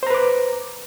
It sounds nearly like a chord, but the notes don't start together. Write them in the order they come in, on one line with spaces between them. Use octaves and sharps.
C5 A#5 B4 D6